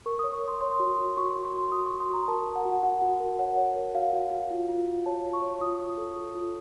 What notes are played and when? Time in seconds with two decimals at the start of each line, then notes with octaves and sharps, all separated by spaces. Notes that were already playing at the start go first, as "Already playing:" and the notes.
0.06 A#4 C#6
0.19 C#5 D#6
0.33 C#6
0.43 C#5 C6
0.61 C#5 C6
0.80 F#4
0.98 F#4
1.17 F#4 C#6
1.35 F#4
1.45 C6
1.54 F#4
1.72 F#4 D#6
1.86 F#4 C#6
2.00 C6
2.10 F#4 A#5
2.28 A#4 A5
2.47 A#4
2.56 F#5
2.65 F#4
2.83 F#4 F#5
3.02 F#4
3.20 A#4
3.39 C#5 F#5
3.57 C#5
3.76 A#4
3.95 F#4 F5
4.13 F#4
4.31 F#4
4.51 F4
4.69 F4
4.88 F4
5.06 C#5 A5
5.25 F4
5.33 C#6
5.42 C#5
5.60 F4 D#6
5.79 F4
5.98 A4
6.16 A4
6.35 F4